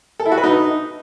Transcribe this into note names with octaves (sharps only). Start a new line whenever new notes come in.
A4
E4
F#4
B4
D#4